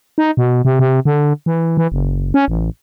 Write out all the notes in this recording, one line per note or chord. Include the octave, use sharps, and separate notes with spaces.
D#4
B2
C3
C3
D3
E3
E3
F#1
C#4
A1